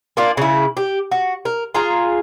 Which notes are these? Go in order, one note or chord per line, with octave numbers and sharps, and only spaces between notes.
A#3 D4 F4
C#3 E4
G4
F#4
A#4
F4 G#4 A#5